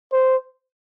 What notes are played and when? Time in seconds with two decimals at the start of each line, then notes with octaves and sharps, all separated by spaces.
0.13 C5